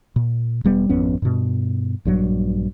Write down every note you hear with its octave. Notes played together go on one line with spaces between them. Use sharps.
A#2
E1 G3 B3
G#1 F2 B3 C#4
G2 B2
A#1 G2 F#3